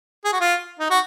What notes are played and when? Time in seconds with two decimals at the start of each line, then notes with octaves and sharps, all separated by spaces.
0.25 G#4
0.33 F#4
0.41 F4
0.80 D#4
0.91 F#4